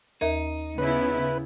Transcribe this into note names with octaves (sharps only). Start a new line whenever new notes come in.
D#2 D#4 A#4
C#3 B3 E4 B4